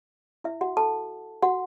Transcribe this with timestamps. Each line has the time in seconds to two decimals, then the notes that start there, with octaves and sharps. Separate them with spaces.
0.44 E4 E5
0.61 F#4 F#5
0.77 A4 A5
1.42 F#4 F#5